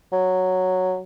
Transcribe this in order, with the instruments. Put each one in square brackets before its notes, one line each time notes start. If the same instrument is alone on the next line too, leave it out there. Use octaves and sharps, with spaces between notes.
[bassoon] F#3